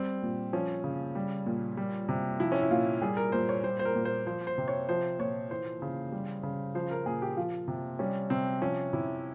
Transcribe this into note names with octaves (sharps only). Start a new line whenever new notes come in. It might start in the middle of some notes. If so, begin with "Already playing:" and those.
Already playing: G3 C4
A#2
F3 C#4
C#3
G3
A#2
G3
C3
F3 E4
C#4
E4
A#2 F4
G3 G#4
A#4
A#2 C5
C#5
G3 C5
C5
A#4
A#2
C5
F3 C5
C5
C3
C#5
F3 C5
A#2 C#5
E3 C5
C#3
G3
C#3
F3 C5
A#4
A#2 G#4
G4
F3 F4
C3
G3 C#4
C3 C4
F3 C#4
C3 E4